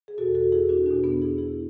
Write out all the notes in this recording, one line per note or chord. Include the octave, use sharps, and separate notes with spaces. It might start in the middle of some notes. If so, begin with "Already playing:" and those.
G#4
E2 B2 F#4 A4
F#4 A4
E4 G#4
D4 F#4
E2 B2 D4 F#4
B3 D4
E4 G#4
E4 G#4